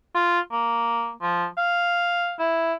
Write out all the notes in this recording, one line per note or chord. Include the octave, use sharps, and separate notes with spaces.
F4
A#3
F3
F5
E4